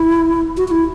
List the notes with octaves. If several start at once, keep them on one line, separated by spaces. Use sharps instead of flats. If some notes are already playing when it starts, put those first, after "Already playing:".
Already playing: E4
F#4
F#4
E4